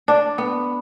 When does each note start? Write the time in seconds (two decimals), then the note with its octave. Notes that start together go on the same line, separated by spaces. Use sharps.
0.08 D4
0.38 B3